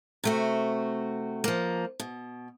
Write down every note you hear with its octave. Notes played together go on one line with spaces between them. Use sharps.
C3 A3 F#4
F3 A#3
B2